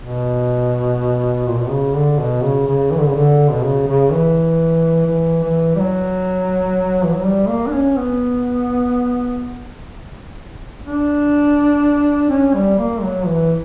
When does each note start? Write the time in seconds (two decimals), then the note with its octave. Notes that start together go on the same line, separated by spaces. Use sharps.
0.02 B2
1.47 A#2
1.58 B2
1.70 C#3
1.95 D3
2.19 B2
2.43 C#3
2.67 C#3
2.91 E3
2.99 D3
3.07 C#3
3.16 D3
3.51 B2
3.63 C#3
3.88 C#3
4.11 E3
5.07 E3
5.43 E3
5.76 G3
5.80 F#3
7.04 E3
7.14 F#3
7.24 G3
7.48 A#3
7.67 D4
7.73 C#4
7.97 B3
10.85 D4
12.30 C#4
12.54 G3
12.78 A#3
13.02 F#3
13.27 E3